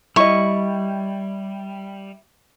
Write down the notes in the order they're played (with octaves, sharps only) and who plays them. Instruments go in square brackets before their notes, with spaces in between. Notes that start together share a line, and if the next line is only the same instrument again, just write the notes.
[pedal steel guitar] G3 [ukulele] E4 D#5 [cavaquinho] C#6